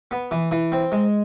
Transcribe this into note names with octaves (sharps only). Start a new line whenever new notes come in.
B3
E3
E3
C4
G#3